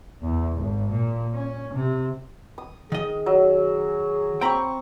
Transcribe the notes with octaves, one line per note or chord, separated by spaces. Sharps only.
E2
G#1
A#2
C#4
C3
D#6
D#3 G#4 D#5
F#3
C4 G5 A#5 B5 C#6